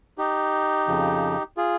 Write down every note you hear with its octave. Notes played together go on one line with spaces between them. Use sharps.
D#4 G4
F2 C#3 F3
F4 G#4